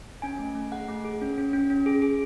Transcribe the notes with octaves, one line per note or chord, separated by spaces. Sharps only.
C#4 G#5
A3
A3
G#4 F#5
A3
G#4
C#4
C#4
C#4
C#4
G#4
G#4